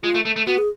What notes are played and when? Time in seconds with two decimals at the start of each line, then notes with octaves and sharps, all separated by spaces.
0.03 G#3 F4
0.14 A3
0.25 A3
0.36 A3
0.47 B3 F#4
0.58 G#4